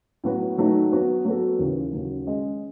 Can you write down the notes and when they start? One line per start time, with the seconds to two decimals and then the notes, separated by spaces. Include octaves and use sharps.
0.24 A2 F#3 B3 F#4 B4
0.57 D#3 F#3 A3 D#4
0.92 F#3 B3 F#4 B4
1.25 F#3 B3 F#4 A4
1.59 D#2 C#3 E3
1.93 D#2 C#3 F#3
2.26 G#3 C#4 G#4 D#5